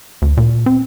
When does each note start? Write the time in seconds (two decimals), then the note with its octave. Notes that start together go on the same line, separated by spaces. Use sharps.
0.22 D2
0.37 A#2
0.66 C4